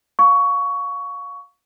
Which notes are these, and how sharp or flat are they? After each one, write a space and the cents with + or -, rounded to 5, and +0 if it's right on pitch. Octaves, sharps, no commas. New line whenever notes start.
F5 +20 C#6 +15